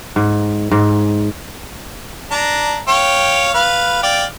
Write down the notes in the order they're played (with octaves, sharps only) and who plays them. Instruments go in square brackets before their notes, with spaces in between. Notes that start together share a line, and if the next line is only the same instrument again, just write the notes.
[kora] G#2
G#2
[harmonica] D4 A#5
C#5 F5 G5
B4 F5
D5 F5 G5